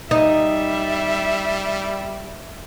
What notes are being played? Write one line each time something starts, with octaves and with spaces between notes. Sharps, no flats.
G3 D#4 E5